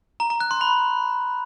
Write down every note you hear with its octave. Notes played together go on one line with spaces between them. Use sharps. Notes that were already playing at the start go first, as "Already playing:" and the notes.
A#5
A#5
F#6
C6
B5